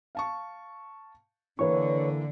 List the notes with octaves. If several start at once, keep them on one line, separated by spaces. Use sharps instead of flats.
F5 A5 C#6
D3 E3 A#3 B4 C#5 C#6